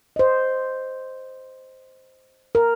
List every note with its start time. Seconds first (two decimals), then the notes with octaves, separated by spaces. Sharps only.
0.16 C5 D#5
2.55 A#4